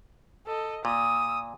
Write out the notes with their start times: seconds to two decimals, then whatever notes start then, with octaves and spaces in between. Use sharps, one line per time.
0.46 A4 D#5
0.85 A#2 D#6 E6